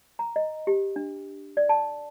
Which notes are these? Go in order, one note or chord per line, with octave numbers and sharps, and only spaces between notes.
A#5
D#5
G4
D4
D5
A5